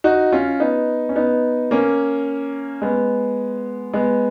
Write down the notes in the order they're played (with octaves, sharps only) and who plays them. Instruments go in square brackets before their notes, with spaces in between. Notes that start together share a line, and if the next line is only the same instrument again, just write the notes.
[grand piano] D#4 F#4
C#4 F4
B3 D#4
C#4
B3 D#4
A#3 C#4
G#3 B3
G#3 B3